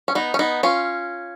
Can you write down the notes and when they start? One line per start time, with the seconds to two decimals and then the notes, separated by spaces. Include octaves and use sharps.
0.08 C#4
0.15 B3 D#4
0.34 C#4
0.39 B3 D#4
0.63 C#4 F4